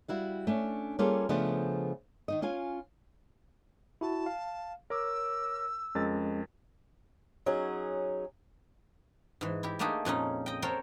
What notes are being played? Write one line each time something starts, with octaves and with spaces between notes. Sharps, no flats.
G3 E4 F#4 F5
A3 C#4 D4
G3 A#3 C#4 F4 G#4 A4
C#3 F3 A3 B3 D4 C5
D#3 D#4 D#5
C#4 F4 F5 G#5
E4 F#4 A5
F5
A#4 C#5 D6 E6
F2 G#3 C#4 A#4 D#5 A6
F#3 C#4 D#4 G#4
G#2 E3
E4 G4
A3 A#3 D4 D#4 G4 G#4
F2 A#2 C#4 D#4
D#5 G5
A4 A#4 C5 C#5 F#5 G5